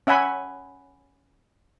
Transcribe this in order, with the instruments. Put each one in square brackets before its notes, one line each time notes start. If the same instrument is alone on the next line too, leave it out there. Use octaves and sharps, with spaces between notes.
[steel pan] C#4 E5 F#5 G#5 B5